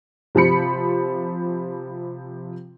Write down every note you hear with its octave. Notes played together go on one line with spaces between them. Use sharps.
C3 F3 C5 B5 C#7